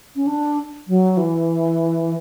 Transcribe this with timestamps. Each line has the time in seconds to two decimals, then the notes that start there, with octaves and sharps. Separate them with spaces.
0.16 C#4
0.27 D4
0.87 F#3
1.17 E3